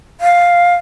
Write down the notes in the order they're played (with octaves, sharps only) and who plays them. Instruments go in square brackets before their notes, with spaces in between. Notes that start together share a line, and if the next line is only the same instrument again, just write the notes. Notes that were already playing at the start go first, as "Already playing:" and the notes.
[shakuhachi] F5